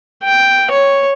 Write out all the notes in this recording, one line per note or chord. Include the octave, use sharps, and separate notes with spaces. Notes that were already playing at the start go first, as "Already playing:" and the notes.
G5
C#5